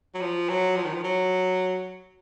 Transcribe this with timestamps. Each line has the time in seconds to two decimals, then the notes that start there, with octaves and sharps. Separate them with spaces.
0.15 F#3
0.21 F3
0.49 F#3
0.76 F3
0.85 D#3
0.93 F3
1.04 F#3